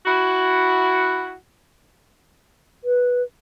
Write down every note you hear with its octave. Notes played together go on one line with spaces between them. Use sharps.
E4 F#4
B4